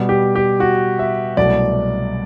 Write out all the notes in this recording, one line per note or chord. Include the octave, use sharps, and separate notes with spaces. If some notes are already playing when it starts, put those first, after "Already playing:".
Already playing: B2 G3 B3
G4
G4
F#4
E5
C2 B2 F#3 A3 D5